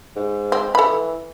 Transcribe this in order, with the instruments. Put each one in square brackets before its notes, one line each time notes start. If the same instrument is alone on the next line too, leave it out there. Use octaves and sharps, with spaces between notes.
[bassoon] G#2
[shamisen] C4
[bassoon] E3 [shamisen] A4 B5